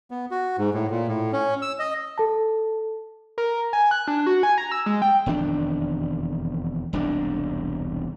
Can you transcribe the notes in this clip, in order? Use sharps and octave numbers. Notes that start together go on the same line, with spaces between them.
B3
F#4
G#2
A2
A#2
A2
C#4
E6
D#5
A4 A5
A#4
G#5
F#6
D4
F#4
G#5
A#5
E6
G#3
G5
E1 F2 D#3 D4
E1 C2 G#2 D4